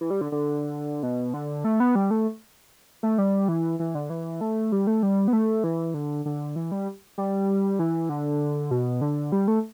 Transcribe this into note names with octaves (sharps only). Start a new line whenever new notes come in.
E3
G3
D3
D3
B2
D3
A3
B3
G3
A3
A3
G3
E3
E3
D3
E3
A3
G3
A3
G3
B3
A3
E3
D3
D3
E3
G3
G3
E3
D3
B2
D3
G3
A3